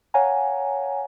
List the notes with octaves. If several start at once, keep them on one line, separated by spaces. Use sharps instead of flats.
C#5 F5 F#5 G#5 A#5